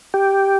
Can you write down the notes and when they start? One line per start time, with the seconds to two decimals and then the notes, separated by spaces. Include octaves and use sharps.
0.14 G4